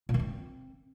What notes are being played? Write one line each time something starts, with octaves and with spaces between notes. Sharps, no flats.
A#2
D#3
C4